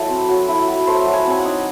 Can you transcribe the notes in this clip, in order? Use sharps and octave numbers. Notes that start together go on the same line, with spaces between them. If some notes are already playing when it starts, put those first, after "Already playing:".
Already playing: F#3 E4 A4
C4
F#3
E4
F#3
A3 C5
F#3
G#5
C4 G#5
F#5
D#4